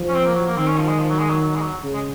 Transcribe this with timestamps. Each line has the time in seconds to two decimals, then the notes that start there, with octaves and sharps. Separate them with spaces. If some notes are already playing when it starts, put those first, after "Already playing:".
Already playing: F3
0.08 C#4
0.14 C4
0.25 A#3
0.35 F#3
0.46 A#3
0.56 D#3 C4
0.67 C#4
0.78 F3
0.88 G#3
0.99 F3
1.09 F#3
1.19 G#3
1.30 F#3
1.41 F#3
1.55 G#3
1.61 F#3
1.83 C#3
1.94 G#3